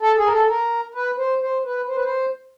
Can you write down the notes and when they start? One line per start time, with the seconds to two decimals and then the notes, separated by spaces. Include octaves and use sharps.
0.01 A4
0.18 G#4
0.26 A#4
0.32 A4
0.48 A#4
0.95 B4
1.18 C5
1.42 C5
1.65 B4
1.88 C5
1.96 B4
2.04 C5